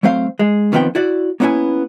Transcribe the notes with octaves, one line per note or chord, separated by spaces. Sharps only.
F#3 A3 C4 C5 F5
G#3
F2 D#3 F3 B3 C4 G5
E4 F#4 D5
A#3 B3 C#4 D#4 E4 G#5